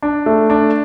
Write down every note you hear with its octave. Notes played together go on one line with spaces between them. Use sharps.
D4
A3
D4